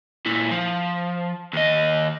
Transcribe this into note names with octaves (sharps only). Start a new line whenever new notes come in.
A#2 E4
F3
D#2 D#5